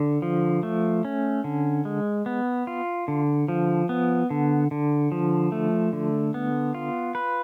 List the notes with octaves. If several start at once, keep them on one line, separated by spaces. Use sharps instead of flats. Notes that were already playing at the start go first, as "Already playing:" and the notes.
Already playing: D3
F3
A3
C#4
D3
G#3
B3
F4
D3
F3
B3
D3
D3
F3
A3
D3
B3
F4
B4